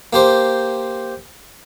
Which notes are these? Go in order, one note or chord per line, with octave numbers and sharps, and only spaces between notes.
A#3 G4 C5